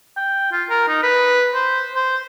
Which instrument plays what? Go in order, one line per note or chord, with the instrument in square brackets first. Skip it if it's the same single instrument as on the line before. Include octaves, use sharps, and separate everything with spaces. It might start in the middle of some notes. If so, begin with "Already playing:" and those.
[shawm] G5
F4
A#4
D#4
B4
C5
C5